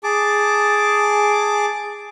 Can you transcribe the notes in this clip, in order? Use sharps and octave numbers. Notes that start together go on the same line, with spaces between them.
G#4 A5 D6